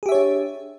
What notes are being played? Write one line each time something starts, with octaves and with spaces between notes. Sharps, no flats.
D4 G4 G#4 C#5 E5